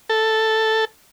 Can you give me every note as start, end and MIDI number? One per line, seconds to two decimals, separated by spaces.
0.09 0.85 69